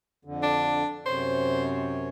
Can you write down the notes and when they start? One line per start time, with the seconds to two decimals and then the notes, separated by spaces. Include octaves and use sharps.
0.25 F2 D3
0.43 D4
1.06 F#2 C3 C5 C#5